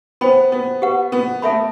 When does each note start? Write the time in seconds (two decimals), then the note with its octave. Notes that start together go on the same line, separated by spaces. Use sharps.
0.21 B3 C5 G5 B5
0.52 B3
0.82 G4 B4 F#5
1.12 B3
1.42 A3 A4 E5 B5